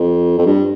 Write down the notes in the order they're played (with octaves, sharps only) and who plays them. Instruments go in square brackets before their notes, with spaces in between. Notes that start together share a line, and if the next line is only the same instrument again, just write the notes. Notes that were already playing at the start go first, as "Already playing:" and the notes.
Already playing: [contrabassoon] F2
F2
G2